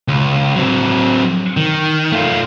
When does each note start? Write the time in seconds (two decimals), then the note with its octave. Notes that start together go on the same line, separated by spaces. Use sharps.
0.08 C#2
0.56 F#3 C4
1.57 D#3
2.12 A3 F4